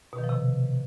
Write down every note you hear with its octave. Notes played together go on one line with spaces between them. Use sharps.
B2
D#3
F3
C3